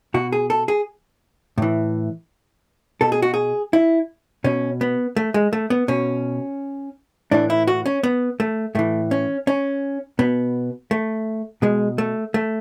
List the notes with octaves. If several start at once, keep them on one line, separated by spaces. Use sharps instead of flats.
B2 F#4
G#4
A4
G#4
A2 E3
B2 A4
G#4
F#4
G#4
E4
B2 C#4
B3
A3
G#3
A3
B3
B2 C#4
A2 E3 D4
E4
F#4
C#4
B3
A3
A2 E3 A3
C#4
C#4
B2 B3
A3
B2 G#3
A3
A3